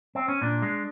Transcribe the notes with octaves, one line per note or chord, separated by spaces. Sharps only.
C4
C#4
A#2 D4
G#3